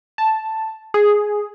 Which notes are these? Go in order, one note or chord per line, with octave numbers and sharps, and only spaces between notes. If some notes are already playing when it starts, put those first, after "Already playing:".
A5
G#4